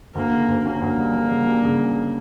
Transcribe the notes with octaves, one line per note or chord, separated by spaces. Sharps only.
D2 A#3
C#3
D2
A#3 C#4
D2
G3
G3
C#3
G3
C#3